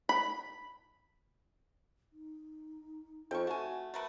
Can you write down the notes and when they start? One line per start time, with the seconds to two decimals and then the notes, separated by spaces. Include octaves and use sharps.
0.09 B5
2.13 D#4
3.31 F2 G5 C#6
3.47 A3 F#4 G#5
3.94 A3 A#4 B4